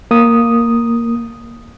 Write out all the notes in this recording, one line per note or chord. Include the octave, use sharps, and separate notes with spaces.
A#3 D#6